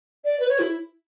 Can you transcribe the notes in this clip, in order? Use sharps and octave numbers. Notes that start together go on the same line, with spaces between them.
D5
B4
C#5
E4